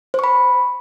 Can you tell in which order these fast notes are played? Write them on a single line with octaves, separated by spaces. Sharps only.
C5 C#6 B5